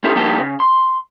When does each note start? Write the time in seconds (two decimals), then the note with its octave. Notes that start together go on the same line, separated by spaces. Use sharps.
0.04 C4 C#4 D#4 E4 G4 A4
0.15 F3 G3 A#3 D#4 G5 A5
0.39 C#3
0.60 C6